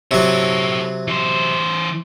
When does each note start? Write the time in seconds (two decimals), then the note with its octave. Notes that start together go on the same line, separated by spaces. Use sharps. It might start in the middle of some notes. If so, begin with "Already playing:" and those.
0.11 C3 F#3 A4 C#5
1.08 E3 C5